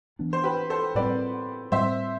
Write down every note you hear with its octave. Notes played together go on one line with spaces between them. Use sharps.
E3 B3 D4
C5
G4 B4
A4 C5
A2 G3 C4 B4 D5
A2 G3 C4 C5 E5